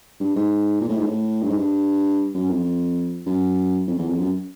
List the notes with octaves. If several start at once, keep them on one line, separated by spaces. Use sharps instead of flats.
G2
G#2
A#2
A2
G#2
A2
G2
G#2
G2
F#2
F2
F#2
F2
E2
F2
F#2